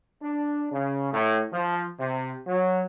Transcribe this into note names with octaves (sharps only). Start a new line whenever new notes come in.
D4
C#3
A2
F3
C3
F#3